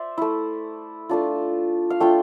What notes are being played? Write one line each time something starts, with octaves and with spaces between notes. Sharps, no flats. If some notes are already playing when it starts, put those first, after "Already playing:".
Already playing: C5 D5 E5
A3 E4
A3 D4 F4
F5
A3 D4 F4 G5